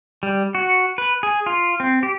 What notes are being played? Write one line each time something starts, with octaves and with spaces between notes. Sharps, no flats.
G3
F#4
B4
G#4
F4
C4
G4